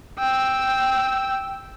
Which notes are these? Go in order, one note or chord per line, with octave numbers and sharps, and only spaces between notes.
G5 E6